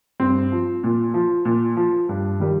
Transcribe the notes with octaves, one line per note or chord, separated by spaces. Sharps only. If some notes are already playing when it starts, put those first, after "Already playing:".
G2 C4
F3
A#2
F3
A#2
F3
G2
D#3 G3